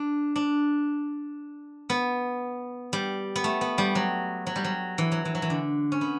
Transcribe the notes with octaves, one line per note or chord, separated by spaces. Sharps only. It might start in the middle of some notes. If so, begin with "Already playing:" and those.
Already playing: D4
D4
B3
G3
B3
A3
B3
G3
F#3
F#3
G3
F#3
E3
F#3
E3
F#3
E3
D3
C#4
B3